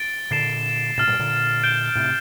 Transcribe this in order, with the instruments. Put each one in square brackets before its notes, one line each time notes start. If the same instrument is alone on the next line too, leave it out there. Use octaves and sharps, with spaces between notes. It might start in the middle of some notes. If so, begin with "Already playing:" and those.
Already playing: [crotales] A6 D7 G7
[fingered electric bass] A#2 D3 [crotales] A6 C7 E7
[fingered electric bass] A2 C3 [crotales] F6 A6 E7
[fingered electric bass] G2 A#2
A#2 D3
[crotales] G6 D7 G7
[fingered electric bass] A2 C3